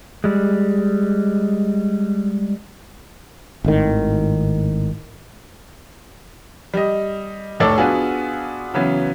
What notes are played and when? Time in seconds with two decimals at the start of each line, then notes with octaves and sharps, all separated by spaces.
0.24 G3 G#3
3.65 G#1 A2 D#3
6.74 G3 D#5
7.60 F1 A2 A4 C#5 D5 E6
7.78 B3 D4 F4 F#4 G#4
8.74 C#3 E3 F#3 B3